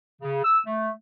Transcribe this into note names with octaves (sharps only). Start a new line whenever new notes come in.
C#3
E6
A3